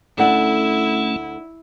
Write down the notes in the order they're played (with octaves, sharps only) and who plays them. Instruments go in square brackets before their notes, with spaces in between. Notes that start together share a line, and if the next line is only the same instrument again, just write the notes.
[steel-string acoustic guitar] D2 A4 F#5 [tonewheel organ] A3 C#4 [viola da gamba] E4